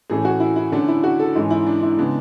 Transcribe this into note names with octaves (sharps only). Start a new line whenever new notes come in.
A2 E3 A3 C#4 G#4
F#4
E4
E4
D3 A3 C#4 D4
E4
F#4
A4
G#2 E3 G#3 C#4
E4
D4
E4
C#3 G#3 B3 D4